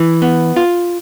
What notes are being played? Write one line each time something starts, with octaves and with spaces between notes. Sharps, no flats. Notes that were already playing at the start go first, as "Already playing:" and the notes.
Already playing: E3
B3
F4